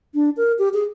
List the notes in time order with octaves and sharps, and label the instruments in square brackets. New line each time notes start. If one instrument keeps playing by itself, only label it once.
[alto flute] D4
A#4
G4
G#4